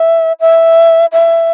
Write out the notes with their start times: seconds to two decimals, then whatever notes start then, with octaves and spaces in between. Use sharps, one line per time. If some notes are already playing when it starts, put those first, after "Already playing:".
Already playing: E5
0.40 E5
1.12 E5